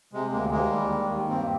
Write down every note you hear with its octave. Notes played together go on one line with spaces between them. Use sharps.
C3 G#3
D2 G#3 A#3
D#2 G#3 A#3
G3
D#3
D#2
G2 A#3 C4